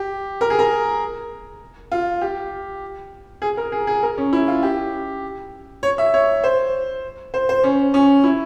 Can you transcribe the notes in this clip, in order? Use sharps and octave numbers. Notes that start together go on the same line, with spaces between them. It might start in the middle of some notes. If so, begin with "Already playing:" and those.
Already playing: G4
A#4
G#4
A#4
F4
G4
G#4
A#4
G#4
G#4
A#4
C#4
E4
F4
G4
C#5
E5
C#5
C5
C5
C5
C#4
C#4
E4